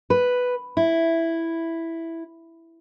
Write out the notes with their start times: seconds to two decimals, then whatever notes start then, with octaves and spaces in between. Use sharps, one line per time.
0.10 B4
0.77 E4